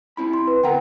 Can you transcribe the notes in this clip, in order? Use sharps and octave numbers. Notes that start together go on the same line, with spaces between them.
C4 E4 B5
C6
B4
D2 B3 A#4 F#5 G5 A#5